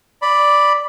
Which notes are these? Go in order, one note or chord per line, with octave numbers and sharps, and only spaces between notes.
D5 B5